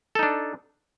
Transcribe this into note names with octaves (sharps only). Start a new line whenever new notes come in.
D4 D#4 A4